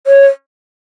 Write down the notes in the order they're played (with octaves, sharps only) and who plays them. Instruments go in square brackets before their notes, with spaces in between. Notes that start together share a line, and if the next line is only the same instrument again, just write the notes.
[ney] C#5